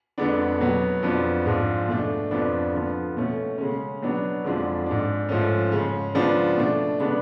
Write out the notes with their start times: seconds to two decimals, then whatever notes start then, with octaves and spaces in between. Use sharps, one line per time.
0.18 F2 D3 G#3 B3 D4
0.60 B2 F#3 B3
1.03 F2 F3 B3 D4
1.46 G#2 F3 G#3 D4
1.88 B2 A3 D4
2.31 F2 F3 B3 D4
2.73 D3 F3 B3
3.17 B2 A3 C#4
3.58 C#3 G#3 C#4
4.02 B2 F#3 B3 D4
4.44 F2 D3 F3 G#3 D4
4.86 G#2 G#3 D4
5.29 G#2 F3 A3 C#4
5.72 C#3 G#3 C#4
6.15 C#3 F3 G#3 B3 D4
6.57 B2 A3 D4
7.00 C#3 G#3 B3 D4